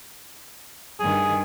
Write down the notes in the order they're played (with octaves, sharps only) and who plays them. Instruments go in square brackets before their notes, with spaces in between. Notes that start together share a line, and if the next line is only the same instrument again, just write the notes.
[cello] G2 D#3 [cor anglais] G#4